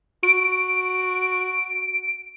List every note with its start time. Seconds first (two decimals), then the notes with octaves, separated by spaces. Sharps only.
0.23 F#4 D7